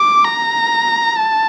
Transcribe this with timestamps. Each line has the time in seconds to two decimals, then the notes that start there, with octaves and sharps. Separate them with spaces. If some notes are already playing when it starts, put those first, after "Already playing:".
Already playing: D6
0.25 A#5
1.17 A5